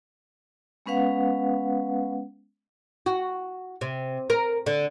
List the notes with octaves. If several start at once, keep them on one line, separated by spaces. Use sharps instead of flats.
G#3 B3 C#4 B4 F5 F#5
F#4
C3
A#4
D3